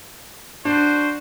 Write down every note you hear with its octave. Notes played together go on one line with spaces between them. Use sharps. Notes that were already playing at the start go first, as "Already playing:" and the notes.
D4 F#4 C5